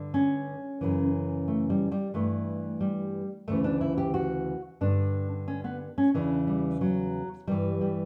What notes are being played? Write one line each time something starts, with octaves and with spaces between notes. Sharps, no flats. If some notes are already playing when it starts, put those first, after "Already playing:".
Already playing: G2 D3
C#4
F#2 C#3 E3
A3
G3
G3
G2 E3 A3
G3
D2 C#3 E3 A3
D4
E4
G4
F#4
G2 D3 D4
C#4
B3
C#4
E2 C#3 E3 D4
G3
F#3
G2 E3 G3
G3